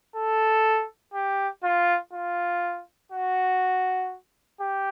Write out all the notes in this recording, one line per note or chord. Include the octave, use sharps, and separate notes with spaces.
A4
G4
F4
F4
F#4
G4